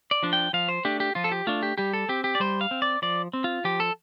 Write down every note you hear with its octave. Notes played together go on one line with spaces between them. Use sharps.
D5
F3 D4
G5
F3 F5
C5
A3 D4 G4
G4
F3 F4
A4
G4
A3 D4 F4
G4
G3 G4
A4
C4 G4
G4
D5
G3 C5
F5
C4
D5
F3 D5
C4
F4
F3 G4
A4